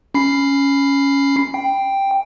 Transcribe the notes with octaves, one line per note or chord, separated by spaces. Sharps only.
C#4 B5 C7
G5